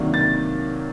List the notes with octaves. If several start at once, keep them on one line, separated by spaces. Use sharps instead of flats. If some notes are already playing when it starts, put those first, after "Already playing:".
Already playing: C3 D#3 F#3 A#3 D4
A6